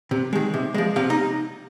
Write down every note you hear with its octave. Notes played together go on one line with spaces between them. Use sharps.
C3
D#3 G#3
C3
F3 G#3
C3 F5
D#4